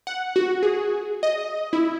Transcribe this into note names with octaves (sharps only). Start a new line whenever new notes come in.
F#5
F#4
G#4
D#5
E4